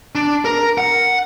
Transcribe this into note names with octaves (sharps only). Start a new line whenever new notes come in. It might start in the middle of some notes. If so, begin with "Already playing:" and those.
D4
A#4
F#5